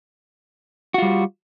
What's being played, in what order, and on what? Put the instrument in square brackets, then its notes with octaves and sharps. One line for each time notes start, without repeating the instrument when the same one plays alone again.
[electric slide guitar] F#4
F4
G3